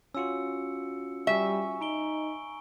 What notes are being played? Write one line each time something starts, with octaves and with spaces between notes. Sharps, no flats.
C#4 F4 F#4 E6 C#7
G3 E5 G#5 C#6
D#4 A#5 D7 G7